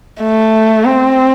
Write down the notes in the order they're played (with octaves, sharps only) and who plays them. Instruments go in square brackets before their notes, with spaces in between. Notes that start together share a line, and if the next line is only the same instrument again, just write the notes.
[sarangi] A3
C4